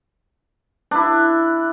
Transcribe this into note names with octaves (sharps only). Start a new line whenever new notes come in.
D4 E4